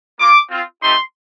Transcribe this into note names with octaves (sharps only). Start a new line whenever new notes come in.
A#3 F4 D6
C4 F4
A3 C4 D#4 G4 C6